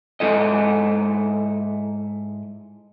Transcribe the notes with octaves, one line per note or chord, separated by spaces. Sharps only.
G#2 G#3 E4 A4 D#5